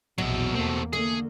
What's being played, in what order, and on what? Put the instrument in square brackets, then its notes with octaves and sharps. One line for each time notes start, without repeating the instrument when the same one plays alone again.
[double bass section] A#1 E2 [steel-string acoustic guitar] B2 [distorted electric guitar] F#3 E5
[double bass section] E2 A#3 [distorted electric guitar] A3 C4
[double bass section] D3 A#3 [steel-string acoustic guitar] A3 [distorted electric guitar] G#4